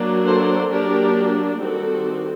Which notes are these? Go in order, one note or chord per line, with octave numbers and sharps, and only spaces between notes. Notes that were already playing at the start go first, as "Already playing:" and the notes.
Already playing: F#3 A#3 D4
A4 C5
F#3 A#3 D4 G4 A#4
D#3 G3 C4 F#4 A4